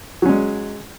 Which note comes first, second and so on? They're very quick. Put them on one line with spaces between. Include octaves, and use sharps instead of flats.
F#3 C#4 G#3